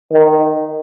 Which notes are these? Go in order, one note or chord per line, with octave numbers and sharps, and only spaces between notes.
D#3